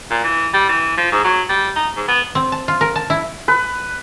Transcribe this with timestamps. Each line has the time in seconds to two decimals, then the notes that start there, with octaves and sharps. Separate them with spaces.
0.10 A#2
0.24 E3
0.53 G3
0.69 E3
0.97 F3
1.12 G#2
1.24 F#3
1.49 G3
1.76 D#4
1.96 G#2
2.08 B3
2.35 C4
2.52 A5
2.68 F4
2.81 A#4
2.96 A5
3.10 E4
3.48 B4